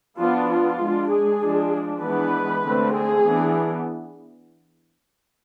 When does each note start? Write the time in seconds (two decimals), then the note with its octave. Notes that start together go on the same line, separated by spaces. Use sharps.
0.18 F3 B3 D4 F4
0.49 F4
0.79 G#3 D4
1.10 G#4
1.41 F3 G#3 D4
2.01 E3 G#3 B3 D4 B4
2.63 D3 A3 C4
2.93 G#4
3.23 E3 B3 D4